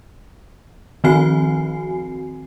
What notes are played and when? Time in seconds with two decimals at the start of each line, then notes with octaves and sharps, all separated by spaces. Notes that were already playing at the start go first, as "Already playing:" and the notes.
1.04 D#3 F3 C4 F#4 G#5 C7